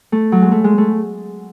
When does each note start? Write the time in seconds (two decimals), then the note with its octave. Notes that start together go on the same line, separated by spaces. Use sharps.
0.12 A3
0.32 F#3
0.42 G#3
0.51 A3
0.64 G#3
0.78 A3